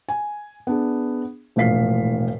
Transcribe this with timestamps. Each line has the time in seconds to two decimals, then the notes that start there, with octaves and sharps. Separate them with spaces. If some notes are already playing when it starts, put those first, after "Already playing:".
0.09 G#5
0.67 B3 D4 G#4
1.56 E1 A#1 A2 F5 B6 C7